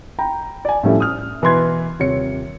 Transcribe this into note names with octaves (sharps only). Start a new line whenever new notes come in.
G5 A#5 B5
D5 G#5
A2 F3 G3 C#4 E4 A4
D#6 F6
B2 E3 B4 C6 G#6
D#1 C3 C#5 C#7